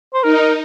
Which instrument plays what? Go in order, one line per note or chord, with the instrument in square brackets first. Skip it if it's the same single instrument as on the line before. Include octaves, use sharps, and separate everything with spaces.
[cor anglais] C5
[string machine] D#4 [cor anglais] A#4